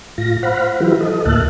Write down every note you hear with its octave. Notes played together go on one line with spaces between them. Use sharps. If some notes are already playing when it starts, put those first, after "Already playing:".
A2 F4 A#6
C5 F5 F#5 B5
E3 F#3 E4 F4 G4 B4
A4 D#5
D2 A2 A#3 E5 A5 F#6